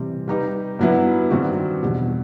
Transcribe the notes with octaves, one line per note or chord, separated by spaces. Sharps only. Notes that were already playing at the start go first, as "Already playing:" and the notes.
Already playing: C3 E3 G3
G3 D#4 G4 B4
G2 F#3 B3 E4 B4
G2 D#3 G3 C4 F#4
E2 B2 G3